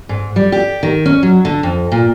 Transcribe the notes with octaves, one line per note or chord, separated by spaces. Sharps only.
G#2
G3
G4
D#3
C#4
F#3
D3
F2
A#2